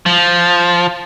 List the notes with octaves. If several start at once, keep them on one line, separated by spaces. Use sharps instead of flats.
F3